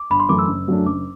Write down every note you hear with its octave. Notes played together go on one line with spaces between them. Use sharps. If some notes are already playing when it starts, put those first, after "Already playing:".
Already playing: D6
G1 B5
C6
F#2 E3 A3 D6
E6
F#1
F#2 F#3 A3 D4
F#1 D6